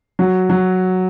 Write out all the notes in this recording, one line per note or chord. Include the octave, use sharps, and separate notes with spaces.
F#3
F#3